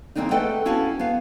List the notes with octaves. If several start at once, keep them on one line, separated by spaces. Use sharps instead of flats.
C#3 E3 A#3 C4 D4 D#4
A3 A4 B4 D#5 F#5 G5
C#4 E4 F#4 F5 A5
B3 F5